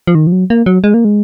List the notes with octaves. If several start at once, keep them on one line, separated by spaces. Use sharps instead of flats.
F3
D#3
F3
F#3
A#3
F#3
G#3
A#3
G#3